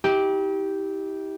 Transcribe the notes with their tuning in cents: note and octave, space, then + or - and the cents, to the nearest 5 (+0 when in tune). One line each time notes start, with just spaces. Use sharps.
E4 -45 G4 -5